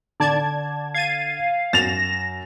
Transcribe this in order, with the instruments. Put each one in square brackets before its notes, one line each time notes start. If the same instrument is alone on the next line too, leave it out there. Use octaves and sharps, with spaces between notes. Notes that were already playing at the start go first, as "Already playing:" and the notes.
[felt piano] D3 [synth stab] D5 A5 G#6
[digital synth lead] F5 [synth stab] G#6 A6 D#7
[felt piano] F#2 [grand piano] A6 F7 [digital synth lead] A#6 [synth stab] E7